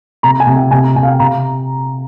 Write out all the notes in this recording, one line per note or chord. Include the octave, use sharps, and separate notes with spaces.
C3 A#5
G#5
C3
G5
C3 G#5
A#5
C3 G#5
F5
G5
C3 A#5